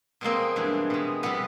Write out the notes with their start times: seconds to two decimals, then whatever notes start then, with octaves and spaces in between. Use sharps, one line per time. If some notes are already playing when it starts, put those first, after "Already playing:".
0.21 B2 G#3 A#3 C4
0.56 G2 E3 G#3
0.90 B2 G#3
1.23 C3 E3 G3 B3